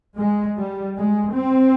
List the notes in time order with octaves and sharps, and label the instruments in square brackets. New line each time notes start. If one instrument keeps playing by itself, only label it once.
[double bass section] G#3
G3
G#3
C4